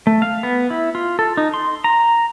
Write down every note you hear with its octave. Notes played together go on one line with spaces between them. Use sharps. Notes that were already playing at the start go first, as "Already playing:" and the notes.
A3
F5
B3
E4
F4
A4
D#4
C6
A#5